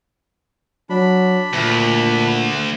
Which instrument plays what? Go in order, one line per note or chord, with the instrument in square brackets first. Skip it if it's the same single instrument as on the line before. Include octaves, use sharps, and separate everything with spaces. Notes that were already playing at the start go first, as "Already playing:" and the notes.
[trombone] F#3 [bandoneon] D4 B5
[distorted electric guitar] D2 [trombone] A#2